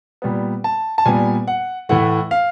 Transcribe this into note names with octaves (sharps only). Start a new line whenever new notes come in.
A#2 G3 B3
A5
A5
A#2 G3 B3 G#5
F#5
A2 E3 A3 F#5
F5